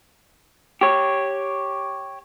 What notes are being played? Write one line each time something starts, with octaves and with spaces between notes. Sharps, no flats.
G4 C#5